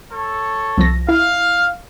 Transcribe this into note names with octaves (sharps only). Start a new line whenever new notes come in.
A4 C#5
C2 F3 A#6
E4 F5